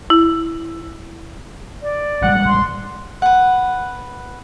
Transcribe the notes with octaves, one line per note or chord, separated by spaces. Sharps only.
E4
D5
A1 G3 G#3 F#5
C6
B4 F#5